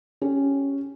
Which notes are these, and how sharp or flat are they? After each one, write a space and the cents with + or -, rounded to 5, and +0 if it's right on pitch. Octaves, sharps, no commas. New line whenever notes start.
C#4 +0 G4 +0